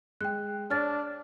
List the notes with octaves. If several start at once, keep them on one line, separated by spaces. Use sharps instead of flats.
G#3 G5 F#6
D4 C#5 D5 F6 A6